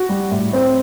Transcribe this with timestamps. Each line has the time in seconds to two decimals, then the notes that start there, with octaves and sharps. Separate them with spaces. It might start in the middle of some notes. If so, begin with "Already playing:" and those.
Already playing: F#4
0.09 G3
0.31 A2
0.53 C4